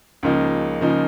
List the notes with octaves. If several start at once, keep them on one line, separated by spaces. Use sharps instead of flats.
C#2 C#3 F3 A#3 D#4
C#2 C#3 F3 A#3 D#4